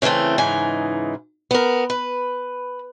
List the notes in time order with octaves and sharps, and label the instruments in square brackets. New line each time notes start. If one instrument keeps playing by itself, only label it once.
[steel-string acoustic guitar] C#3 E3 G3 A3 C4
G#2 C#3 E3 D#4 G#5
B3 A#4
B4